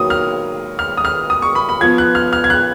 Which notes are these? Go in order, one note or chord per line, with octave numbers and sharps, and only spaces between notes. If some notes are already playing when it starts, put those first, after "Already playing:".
Already playing: D#3 F#3 A#3 D#6
F6
F6
D#6
F6
D#6
C#6
B5
B5
F3 B3 G#6
F#6
F6
F6
G#6
F#6